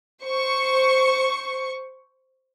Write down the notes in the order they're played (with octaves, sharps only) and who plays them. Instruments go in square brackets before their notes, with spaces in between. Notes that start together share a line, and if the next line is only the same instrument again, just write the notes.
[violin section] C5 C#6